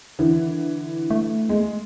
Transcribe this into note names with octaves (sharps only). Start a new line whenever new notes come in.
D3 E3
A3
G#3